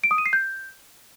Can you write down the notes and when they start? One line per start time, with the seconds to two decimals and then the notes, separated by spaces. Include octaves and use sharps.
0.04 D7
0.11 D#6
0.18 D#7
0.26 C7
0.33 G6